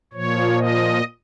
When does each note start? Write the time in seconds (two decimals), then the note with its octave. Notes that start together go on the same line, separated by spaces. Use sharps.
0.13 A#2 F3 C#5
0.58 D#5